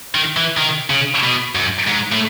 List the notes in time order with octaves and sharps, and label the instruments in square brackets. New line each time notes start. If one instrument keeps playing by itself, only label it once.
[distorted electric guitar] D#3
E3
D#3
C#3
B2
F#2
G#2
A2